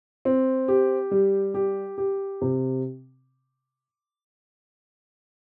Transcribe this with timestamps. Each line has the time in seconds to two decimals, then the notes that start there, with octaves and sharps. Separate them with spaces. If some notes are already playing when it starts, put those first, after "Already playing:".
0.25 C4
0.68 G4
1.11 G3
1.54 G4
1.98 G4
2.42 C3